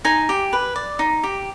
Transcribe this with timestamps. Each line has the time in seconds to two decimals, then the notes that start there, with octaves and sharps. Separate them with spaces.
0.05 D#4 G#5
0.29 G4
0.53 B4
0.76 D5
0.99 D#4
1.23 G4